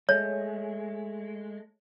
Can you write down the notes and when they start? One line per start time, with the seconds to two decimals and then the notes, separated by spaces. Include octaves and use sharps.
0.09 G#3 A3 C#5